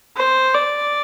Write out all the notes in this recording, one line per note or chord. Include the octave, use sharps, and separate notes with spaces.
C5
D5